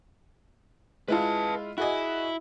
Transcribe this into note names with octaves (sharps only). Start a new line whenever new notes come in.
G#3 E4 F4 B4 A5
E4 F#4 G#4 D#5